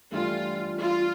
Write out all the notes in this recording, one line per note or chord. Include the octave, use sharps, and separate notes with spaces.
G2 E3 A3 D4 F4 G4
F4